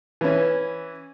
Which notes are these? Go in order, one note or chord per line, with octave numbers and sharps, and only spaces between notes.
E3 C#4